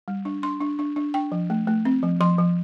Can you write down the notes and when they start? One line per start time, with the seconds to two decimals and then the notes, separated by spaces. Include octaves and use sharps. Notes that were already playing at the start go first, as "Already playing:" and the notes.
0.08 G3
0.25 D4
0.43 D4 C6
0.61 D4
0.79 D4
0.96 D4
1.14 D4 G5
1.32 F3
1.50 A3
1.67 A3
1.85 C4
2.03 F3
2.21 F3 C6
2.38 F3